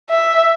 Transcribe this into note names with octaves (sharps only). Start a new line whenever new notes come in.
E5